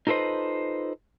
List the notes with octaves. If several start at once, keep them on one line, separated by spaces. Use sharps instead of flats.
D#4 F4 A4 B4 C5 D#5